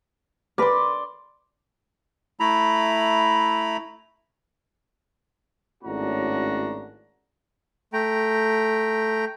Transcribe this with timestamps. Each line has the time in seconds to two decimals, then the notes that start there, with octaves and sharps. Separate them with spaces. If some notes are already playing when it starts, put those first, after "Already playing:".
0.58 A#4 B4 D5 C6
2.40 A3 E4 A#5 B5
5.84 G#1 A2 C#4 D4 F#4 A#5
7.93 A3 G5 A#5